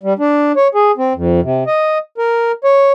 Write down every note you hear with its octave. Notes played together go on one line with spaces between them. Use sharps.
G3
D4
C#5
G#4
C4
F2
C3
D#5
A#4
C#5